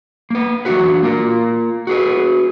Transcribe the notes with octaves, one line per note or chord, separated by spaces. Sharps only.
A#3 B4
E3 F#3 G#3 D4 F#4 B4
A#3 F4 A#4
F#4 G#4 B4